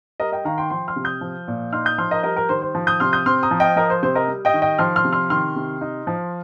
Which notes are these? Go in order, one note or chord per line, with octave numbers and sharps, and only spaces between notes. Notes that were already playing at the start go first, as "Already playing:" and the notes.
G3 A#4 D#5
D#5 G5
D#3 F5 A#5
G5 C6
F3 G5 C6
C6 F6
C3
D#6 G6
F3
A#2
D#4 C6 F6
D#6 G6
F3 C6 F6
A#4 D#5
G3 A#4 D#5
A#4
D#3 C5
C5
F3
D#6 G6
C3 C6 F6
D#6 G6
C4 C6 F6
A#5 D#6
F3
D#5 G5
F3 A#4 D#5
C5
C3 C5
A#4 D#5
G3
D#5 G5
D#3
D#5 G5
F3 C6 F6
C6 F6
C3
C6 F6
D#3 C6 F6
C3
D#4
F3